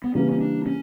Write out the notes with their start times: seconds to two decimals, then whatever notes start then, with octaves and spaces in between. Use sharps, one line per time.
0.04 B3
0.15 C#3 E3 G3 A#3 C#4
0.32 C#4
0.40 D4
0.66 C#4